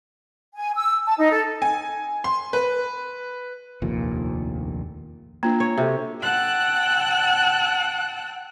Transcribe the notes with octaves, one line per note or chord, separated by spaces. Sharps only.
G#5
E6
A5
D#4
A4
G#5
C6
B4
F1 A#1 D#2 A#2
A#3 D4 F4 A#5
C#5
C3 F#4 A4
F#5 G5 A5 E6 F#6